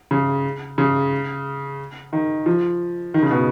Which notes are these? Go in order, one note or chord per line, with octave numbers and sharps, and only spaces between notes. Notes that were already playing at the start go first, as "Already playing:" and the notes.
C#3
C#3
D#3
F3
D#3
C#3
B2